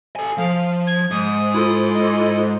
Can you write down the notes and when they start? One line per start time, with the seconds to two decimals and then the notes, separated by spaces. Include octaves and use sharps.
0.16 A4 G#5
0.37 F3 F5
0.87 G#6
1.11 G#2 D#6
1.54 E4 F4 A4
1.94 D#5